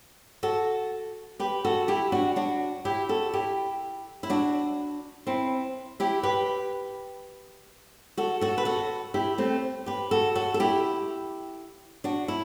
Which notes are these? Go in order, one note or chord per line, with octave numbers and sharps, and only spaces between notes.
F#4 A4
G4 B4
F#4 A4
E4 G4
D4 F#4
D4 F#4
E4 G4
F#4 A4
E4 G4
E4
D4 F#4
C4 E4
E4 G4
G4 B4
F#4 A4
F#4 A4
B4
F#4 A4
E4 G4
A3 C4
G4 B4
F#4 A4
F#4 A4
A4
E4 G4
D4 F#4
E4